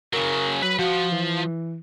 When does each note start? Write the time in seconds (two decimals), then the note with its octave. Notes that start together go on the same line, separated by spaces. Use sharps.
0.13 C#3 F#3 A#4
0.62 F#3 B4 B5
0.79 F3 F#4
1.12 E3